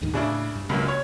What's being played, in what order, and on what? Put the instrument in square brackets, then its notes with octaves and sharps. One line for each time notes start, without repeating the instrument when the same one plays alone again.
[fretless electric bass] D#2 G#2 D#3
[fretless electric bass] A2 [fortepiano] C#3 D4 E4
[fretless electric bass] G2
[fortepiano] C#2 F#2 A#2 [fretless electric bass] C#3
[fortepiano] C#5